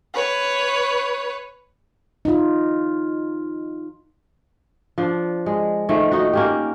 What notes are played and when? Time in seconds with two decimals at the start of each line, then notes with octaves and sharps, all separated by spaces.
0.13 B4 C#5
2.25 D#4 F4
4.98 F3 D4
5.46 G#3
5.89 A#2 D#3 F3 A3
6.12 D#4 F#4
6.33 A#3 C#4 G4